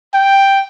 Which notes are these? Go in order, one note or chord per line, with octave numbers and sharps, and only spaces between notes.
G5